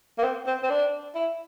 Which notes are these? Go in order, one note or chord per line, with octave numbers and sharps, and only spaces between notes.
A#3
C4
C4
C4
D4
E4